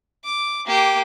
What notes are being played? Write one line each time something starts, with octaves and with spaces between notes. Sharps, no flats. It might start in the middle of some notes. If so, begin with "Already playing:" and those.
D6
A#3 G4